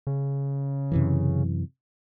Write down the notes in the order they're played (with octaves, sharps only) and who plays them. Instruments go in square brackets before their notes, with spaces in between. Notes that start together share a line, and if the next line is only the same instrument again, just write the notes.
[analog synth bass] C#3
[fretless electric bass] F#2 C3 E3